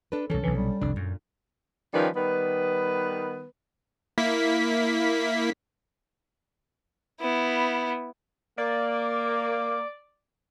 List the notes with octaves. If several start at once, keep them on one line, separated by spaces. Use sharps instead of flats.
D4 A4 B4
C2 E3 C#4 A4
B1 C3 E3
G3
F1 C2 D4
F#2 A#2
D#3 F3 G3 C#4 B4
D#3 G3 B3 B4
A#3 E4 B6
B3 E4
A#3 D5